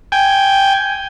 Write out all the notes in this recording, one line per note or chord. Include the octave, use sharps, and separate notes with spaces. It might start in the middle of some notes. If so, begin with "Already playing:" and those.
G5 G#5